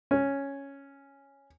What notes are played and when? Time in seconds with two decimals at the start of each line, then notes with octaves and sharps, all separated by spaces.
0.11 C#4